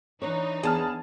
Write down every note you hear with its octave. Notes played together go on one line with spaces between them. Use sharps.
E3 D4 D#4 B4 C#5
E2 B3 G#4 A5 F6